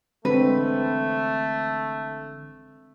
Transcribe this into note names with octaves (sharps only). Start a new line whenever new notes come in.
A1 D3 G#3 A3 C4 D4 B4